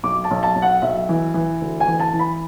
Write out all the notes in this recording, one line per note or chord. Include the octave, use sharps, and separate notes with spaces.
B1 D6
A5
B1
A5
B1
F#5
B1 E5
E3
E3
D2
G#5
E3
A5
E3
B5